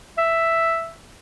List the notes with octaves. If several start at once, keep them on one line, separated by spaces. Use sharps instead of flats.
E5